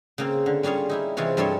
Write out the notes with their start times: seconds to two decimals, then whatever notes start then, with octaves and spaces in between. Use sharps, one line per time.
0.18 C#3 A#3 C4
0.46 D3
0.63 G3 C#4 F4 G#4 C#5
0.89 D#4 E4 G4
1.17 C3 E3 G#3 F4 C#5
1.37 G2 F3 G3 A4 C#5 C6